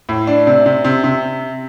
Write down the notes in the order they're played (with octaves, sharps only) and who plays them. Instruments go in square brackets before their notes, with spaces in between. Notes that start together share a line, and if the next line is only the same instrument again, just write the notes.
[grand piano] A2
D4
C3
C3
C3
C3